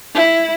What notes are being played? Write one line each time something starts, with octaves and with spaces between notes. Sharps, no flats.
E4